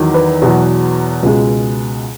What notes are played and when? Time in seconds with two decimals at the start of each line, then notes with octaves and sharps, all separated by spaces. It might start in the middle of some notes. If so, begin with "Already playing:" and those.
Already playing: E2 D#3 F#3
0.14 B4
0.42 E2 B2 F#3
1.23 C#2 B2 G#3